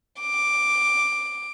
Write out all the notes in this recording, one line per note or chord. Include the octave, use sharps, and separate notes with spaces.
D6